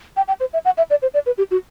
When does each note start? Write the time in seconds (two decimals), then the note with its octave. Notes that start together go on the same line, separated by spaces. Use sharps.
0.17 G5
0.28 G5
0.40 C5
0.53 E5
0.65 F#5
0.78 E5
0.90 D5
1.02 C5
1.14 D5
1.26 B4
1.38 G4
1.51 F#4